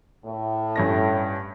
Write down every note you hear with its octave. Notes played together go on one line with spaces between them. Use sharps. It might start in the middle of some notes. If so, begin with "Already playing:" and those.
A2
G2 C#4 A#6